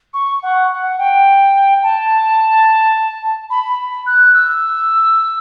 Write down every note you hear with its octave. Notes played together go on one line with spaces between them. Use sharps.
C#6
F#5
F#5
G5
A5
B5
F#6
E6